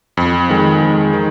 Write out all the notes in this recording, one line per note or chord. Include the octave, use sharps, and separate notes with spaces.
F2
D#3 G#3
F2
D#3